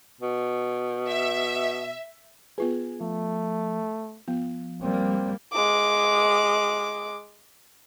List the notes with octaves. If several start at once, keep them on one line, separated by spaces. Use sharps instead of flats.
B2
E5
B3 F4 G#4 B4
F3 A3
F3 B3
G3 A#3 C4
G#3 D6